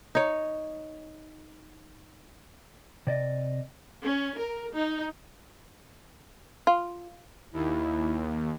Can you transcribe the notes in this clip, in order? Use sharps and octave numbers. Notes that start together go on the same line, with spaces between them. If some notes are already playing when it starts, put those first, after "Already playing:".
D#4 C#5
C3 D5 D#5
C#4
A#4
D#4
F4
D#2 E4